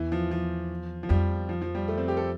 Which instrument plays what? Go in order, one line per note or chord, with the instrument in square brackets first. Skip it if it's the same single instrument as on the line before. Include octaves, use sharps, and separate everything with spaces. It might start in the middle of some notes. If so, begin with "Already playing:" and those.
Already playing: [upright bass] E2 [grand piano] E3
[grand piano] F3
F3
F3
[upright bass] F2 [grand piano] G3
[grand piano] F3
F3
G3
A3
C4
G4
A4